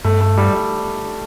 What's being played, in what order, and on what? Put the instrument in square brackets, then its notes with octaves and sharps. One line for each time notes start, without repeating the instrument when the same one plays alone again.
[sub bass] G2 [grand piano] A3
[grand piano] A3
G3
G3